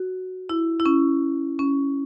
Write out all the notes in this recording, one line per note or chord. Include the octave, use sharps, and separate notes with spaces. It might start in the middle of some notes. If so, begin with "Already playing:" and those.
Already playing: F#4
E4
E4
C#4
C#4